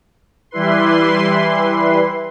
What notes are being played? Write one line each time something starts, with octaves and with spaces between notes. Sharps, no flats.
E3 G3 E4 B4 C6